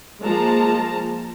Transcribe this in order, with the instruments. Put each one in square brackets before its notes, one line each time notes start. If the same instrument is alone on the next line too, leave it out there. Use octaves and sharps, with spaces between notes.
[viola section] F3 G#3 A#3 A5 A#5